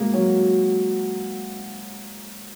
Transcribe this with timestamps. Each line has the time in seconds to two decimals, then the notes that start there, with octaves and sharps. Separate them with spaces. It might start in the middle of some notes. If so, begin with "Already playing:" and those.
Already playing: G#3 A#3
0.14 F#3